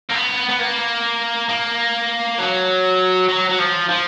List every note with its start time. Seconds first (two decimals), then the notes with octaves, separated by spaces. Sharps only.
0.10 A#3
0.14 B3
0.49 B3
0.59 A#3
1.49 A#3
2.38 F#3
3.29 F#3
3.49 F#3
3.59 F3
3.89 F3